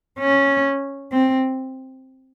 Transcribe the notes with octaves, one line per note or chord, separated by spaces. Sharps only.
C#4
C4